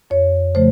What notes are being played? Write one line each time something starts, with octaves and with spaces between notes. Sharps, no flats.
F2 C#5
C#3 F3 A3 C5